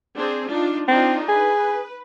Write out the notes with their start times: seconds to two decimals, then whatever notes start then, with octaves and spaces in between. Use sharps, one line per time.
0.16 C4 D4 G#4
0.49 D4 D#4 F4
0.88 C4 D4 D#4 F4
1.28 G#4 B4